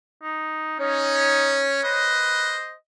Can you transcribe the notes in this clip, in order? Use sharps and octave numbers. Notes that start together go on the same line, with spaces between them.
D#4
C#4 D#4 C#5
B4 C5 D#5